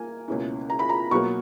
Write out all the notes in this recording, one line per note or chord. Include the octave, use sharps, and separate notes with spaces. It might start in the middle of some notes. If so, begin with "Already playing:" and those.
Already playing: A#3 G#5
C#2 B2 A#3 C#4 E4
A#5
B5
A#5
B2 F#3 A#3 C#6